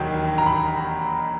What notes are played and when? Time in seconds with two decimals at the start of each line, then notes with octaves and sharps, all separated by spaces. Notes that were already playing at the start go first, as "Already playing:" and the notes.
Already playing: E1 D#2 D#3 F#3
0.38 A#5
0.46 B5